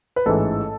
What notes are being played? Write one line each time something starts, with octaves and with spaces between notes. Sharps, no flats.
B4
A1 G#2 E3 A4